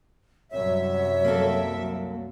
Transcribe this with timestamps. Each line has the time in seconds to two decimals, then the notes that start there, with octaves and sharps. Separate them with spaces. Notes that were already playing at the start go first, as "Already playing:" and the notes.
0.52 C2 F#2 F#3 C#5 E5
1.24 A#3 C4 A4